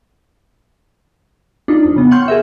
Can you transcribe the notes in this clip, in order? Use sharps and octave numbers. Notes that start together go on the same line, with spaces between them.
D4 D#4 F4
F2
C#3 B3
F#5 G5 C6 C#6 F6 G6
G#4 A#4 E5